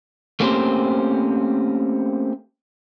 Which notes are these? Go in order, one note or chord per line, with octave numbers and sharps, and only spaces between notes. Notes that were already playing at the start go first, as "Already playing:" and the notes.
A3 A#3 C4 C#4 G4 C5